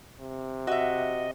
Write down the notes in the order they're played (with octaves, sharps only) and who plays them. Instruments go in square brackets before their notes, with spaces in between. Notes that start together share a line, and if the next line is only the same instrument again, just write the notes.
[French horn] C3
[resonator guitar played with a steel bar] F#4 E5 [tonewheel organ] D#5